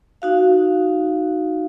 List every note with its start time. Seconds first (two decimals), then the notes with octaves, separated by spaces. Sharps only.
0.22 D#4 F#4 F5